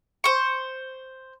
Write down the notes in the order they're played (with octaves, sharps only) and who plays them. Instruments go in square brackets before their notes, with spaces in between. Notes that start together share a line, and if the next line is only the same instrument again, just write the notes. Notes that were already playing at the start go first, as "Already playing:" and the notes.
[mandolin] C5 C#6